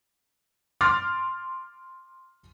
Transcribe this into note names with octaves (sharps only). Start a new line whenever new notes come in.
C6 D6 F6 A6